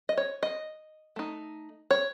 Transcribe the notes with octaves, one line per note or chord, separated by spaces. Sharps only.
D#5
C#5
D#5
A3 D#4
C#5